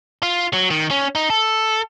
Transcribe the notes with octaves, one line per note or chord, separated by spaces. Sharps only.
F4
F#3
D#3
C#4
D#4
A4